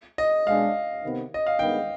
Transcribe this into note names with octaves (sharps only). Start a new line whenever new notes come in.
D#5
B2 G#3 D4 G#4 F5
C3 D#3 B3
D#5
F5
G2 D#3 G#3 B3 G5